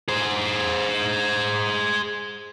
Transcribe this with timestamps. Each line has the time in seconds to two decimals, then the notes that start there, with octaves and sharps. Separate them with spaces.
0.08 G#4 C5